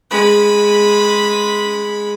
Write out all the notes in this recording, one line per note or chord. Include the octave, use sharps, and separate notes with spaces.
G#3 B5